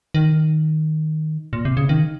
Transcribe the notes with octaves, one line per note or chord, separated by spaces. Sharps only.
D#3
A#2
C3
C#3
D#3